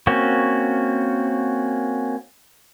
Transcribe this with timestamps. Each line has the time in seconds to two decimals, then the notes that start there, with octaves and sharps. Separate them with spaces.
0.07 A#3 C4 C#4 F#4